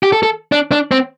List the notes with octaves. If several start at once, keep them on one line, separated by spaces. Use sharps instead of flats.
G4
A4
A4
D4
D4
C4